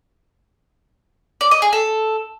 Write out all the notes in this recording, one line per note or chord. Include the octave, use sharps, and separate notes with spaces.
D5
D#5
G#4
A4